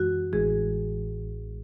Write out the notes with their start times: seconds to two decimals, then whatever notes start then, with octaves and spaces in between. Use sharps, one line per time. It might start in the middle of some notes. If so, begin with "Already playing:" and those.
Already playing: F#2 E3 G#3 F#4
0.32 A1 A2 E3 G#3 G#4